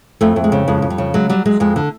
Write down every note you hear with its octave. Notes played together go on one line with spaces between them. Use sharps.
F2 A3
F2
G#3
C#3
F2 G#3
F2
G3
C#3
F#3 G#3
F#3 G3
F#3 G#3
F2 G#3
D3